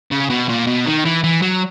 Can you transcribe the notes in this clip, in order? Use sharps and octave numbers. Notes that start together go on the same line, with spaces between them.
C#3
B2
A#2
B2
D#3
E3
E3
F#3